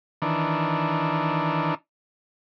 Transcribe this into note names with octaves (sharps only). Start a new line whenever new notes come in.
D#3 E3 D4